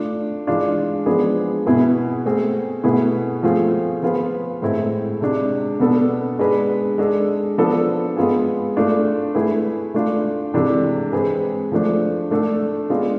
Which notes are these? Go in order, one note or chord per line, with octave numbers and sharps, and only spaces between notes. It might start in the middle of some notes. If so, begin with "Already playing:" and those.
Already playing: A3 D4 F4
E3 G#3 D4 F4
F3 G#3 B3 D4 G#4
B2 B3 E4 G#4 B4
A3 C4 G#4
B2 A3 E4 G#4 B4
F3 A3 C4 F4 G#4
F3 B3 F4 G#4 B4
A2 G#3 C4 E4
C3 G#3 D4
B2 B3 D4 A4
G#3 D4 G#4 B4
G#3 D4 A4
F3 B3 D4 A4
G#3 B3 F4 G#4
A3 D4 F4
A3 E4 G#4 B4
A3 D4 F4
C3 E3 G#3 D4 A4
G#3 C4 G#4 B4
F3 A3 D4
A3 D4 A4
G#3 B3 D4 F4